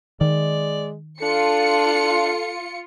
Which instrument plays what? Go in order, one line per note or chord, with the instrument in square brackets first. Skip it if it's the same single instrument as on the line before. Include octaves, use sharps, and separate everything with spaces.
[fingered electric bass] D#3 [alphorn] G#3 [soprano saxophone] D5
[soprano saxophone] D4 [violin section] F4 C#7 [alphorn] A4